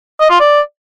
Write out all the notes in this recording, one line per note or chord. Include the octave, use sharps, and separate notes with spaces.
D#5
F4
D5